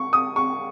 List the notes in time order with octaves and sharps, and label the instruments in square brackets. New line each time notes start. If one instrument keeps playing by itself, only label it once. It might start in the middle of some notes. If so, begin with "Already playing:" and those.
Already playing: [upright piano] C#6
D#6
C#6